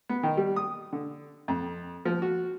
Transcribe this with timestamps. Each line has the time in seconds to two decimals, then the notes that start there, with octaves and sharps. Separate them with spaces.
0.09 B3
0.23 D#3
0.37 G3
0.56 D#6
0.93 D3
1.48 F2
2.05 F3
2.22 F#4